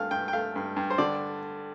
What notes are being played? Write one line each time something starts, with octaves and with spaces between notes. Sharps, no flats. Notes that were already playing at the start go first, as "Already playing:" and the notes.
Already playing: G2 A3 F5
G2 G5
G5
A3 F5
G2
G2
C5
D3 D5